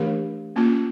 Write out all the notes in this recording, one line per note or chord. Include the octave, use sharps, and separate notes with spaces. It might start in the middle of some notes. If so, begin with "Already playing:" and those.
Already playing: E3 A3 D4 G4 A#4
A#3 C#4 F4